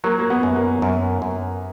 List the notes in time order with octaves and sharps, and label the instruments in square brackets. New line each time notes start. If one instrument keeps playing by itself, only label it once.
[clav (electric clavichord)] F#3 [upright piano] A#3
[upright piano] A#3
B3
[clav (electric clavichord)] F#2
[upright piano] A#3
[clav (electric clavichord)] F#2
F#2